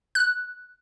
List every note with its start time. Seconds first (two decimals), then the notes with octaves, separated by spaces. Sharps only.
0.15 F#6